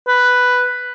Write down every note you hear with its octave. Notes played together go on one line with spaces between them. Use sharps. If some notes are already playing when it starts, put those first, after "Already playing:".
B4